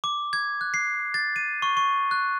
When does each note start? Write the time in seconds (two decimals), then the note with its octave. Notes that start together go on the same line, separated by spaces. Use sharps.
0.04 D6
0.33 G#6
0.61 F#6
0.74 C7
1.14 A6
1.36 D#7
1.62 C#6
1.77 C#6
2.11 F#6